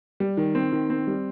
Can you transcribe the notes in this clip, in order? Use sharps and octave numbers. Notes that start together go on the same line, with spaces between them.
G3
D#3
C4
D#3
C4
G3